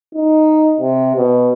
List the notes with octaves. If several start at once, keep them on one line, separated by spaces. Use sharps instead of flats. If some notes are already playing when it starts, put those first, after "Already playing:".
D#4
C3
B2